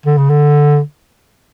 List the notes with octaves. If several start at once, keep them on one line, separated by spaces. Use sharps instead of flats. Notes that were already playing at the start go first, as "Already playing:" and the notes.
D3
C#3
D3